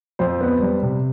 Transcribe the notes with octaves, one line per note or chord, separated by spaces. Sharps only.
F2 C5
B3
G3
C3